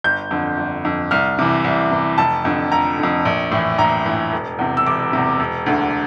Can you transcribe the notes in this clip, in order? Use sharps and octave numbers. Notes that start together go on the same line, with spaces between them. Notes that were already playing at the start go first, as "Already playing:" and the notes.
G1 G6
F2 D3
G1
F2 D3
C2 F6
C3 E3
C2
C3 E3
F1 A5
F2 D3
F1 A#5
F2 D3
A#1
A2 E3
A#1 A#5
A2 E3
E1
E2 C3
E6
E1 D6
E2 C3
E1
D2 D3